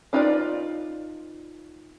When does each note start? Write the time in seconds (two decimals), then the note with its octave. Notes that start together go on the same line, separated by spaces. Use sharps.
0.13 D4 D#4 F4 B4 D5